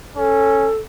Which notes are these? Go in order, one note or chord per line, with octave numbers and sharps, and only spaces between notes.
C#4 A4